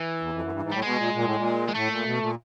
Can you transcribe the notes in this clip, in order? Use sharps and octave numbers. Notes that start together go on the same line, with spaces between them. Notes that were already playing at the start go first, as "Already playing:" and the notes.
Already playing: E3
E2
F2
F#2
G2
G#2
A2 G3
B2 G#3
A#2
A#2
A2
A#2
G#3
A2 A3
A#2
B2
A#2